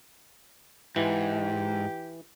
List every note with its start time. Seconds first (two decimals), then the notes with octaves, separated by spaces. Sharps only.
0.96 G#2 E3 G4